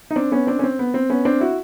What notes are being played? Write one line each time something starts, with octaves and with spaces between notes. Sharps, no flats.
D#4
C4 D4
B3 C#4
C4 D4
C#4
C4
B3
C4
B3 C#4
C4 D4
E4 F#4